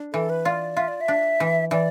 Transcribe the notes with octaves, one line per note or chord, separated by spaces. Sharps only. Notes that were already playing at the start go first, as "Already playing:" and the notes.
Already playing: D4
E3 A4
B4
F4 D5
F4 E5
D5
E5
D4
E3
E3 D5